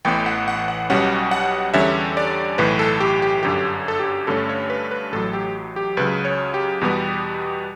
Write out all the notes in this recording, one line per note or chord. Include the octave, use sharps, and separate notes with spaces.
A1 A2 E3 B3 G5
F#5
F#5
F#5
B1 B2 G3 C#4 F#5
F#5
E2 D3 G3 C#4 E5
D5
B1 A2 E3 B4
A4
G4
G4
G1 F#2 D3 G4
A4
G4
G2 D3 A3 C#4 A4
C#5
B4
B4
A1 A2 F#3 A4
G4
G4
C#2 C#3 F#3 B4
C#5
G4
E2 B2 G3 B3